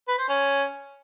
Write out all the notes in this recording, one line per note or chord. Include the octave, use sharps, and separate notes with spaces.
B4
C5
C#4